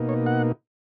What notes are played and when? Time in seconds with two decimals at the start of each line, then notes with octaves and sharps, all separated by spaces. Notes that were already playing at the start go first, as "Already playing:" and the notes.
Already playing: B2 A#3 D#4
0.09 C#5
0.26 F#5